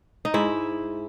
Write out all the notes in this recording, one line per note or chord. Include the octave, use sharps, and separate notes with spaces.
D#4
G#2 E4